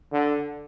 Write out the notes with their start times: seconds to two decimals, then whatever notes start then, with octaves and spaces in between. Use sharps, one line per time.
0.12 D3